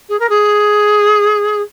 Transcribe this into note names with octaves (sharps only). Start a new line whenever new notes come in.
G#4
A#4
G#4